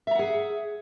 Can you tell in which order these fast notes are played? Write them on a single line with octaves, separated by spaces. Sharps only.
E5 A#5 F#5 G#4